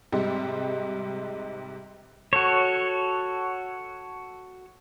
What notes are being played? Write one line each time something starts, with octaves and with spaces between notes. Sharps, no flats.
G#2 C3 G3 D#4
F#4 A4 C#5